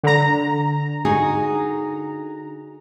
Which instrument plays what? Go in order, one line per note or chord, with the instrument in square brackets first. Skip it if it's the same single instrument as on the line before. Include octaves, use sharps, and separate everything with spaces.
[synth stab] D3 A#5
[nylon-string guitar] D#4 F#4 G#4